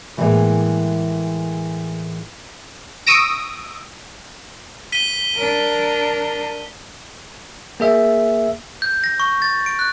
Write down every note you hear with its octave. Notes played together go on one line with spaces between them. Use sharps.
A2 E3 F3 G3 G#3 A#3
C#6 D#6 E6 A#6 D7
B6 D#7 G7
D4 A#4
A#3 G#4 E5
G6
A#6
C#6
A6
D7
F#6